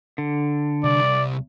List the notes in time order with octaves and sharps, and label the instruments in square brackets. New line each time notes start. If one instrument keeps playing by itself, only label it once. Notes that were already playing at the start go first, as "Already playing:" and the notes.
[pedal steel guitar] D3
[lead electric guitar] C2 [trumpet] D5